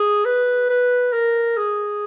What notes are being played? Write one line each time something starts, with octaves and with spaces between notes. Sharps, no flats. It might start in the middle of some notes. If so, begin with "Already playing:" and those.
Already playing: G#4
B4
B4
A#4
G#4